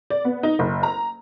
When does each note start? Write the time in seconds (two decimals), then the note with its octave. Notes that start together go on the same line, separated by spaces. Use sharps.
0.10 D5
0.25 B3
0.43 D#4
0.59 F#1
0.83 A#5